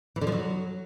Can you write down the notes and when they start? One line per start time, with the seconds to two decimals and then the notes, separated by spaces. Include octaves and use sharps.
0.16 E3
0.21 D3
0.27 F3
0.32 F#3